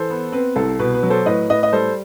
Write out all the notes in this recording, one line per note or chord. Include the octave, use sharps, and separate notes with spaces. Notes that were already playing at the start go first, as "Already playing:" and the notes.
Already playing: E3 A4 C5
B3
C4 B4
C2 A4
B2 B4
B4
F#3
A4 C5
A2 B4 D#5
A2 B4 D#5
D#5
G3 A4 C5